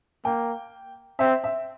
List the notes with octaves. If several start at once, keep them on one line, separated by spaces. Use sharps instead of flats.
A#3 G5
C4 E5
E5